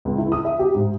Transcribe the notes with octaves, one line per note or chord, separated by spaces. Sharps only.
C#2
E4
D#6
E5
G4
G#2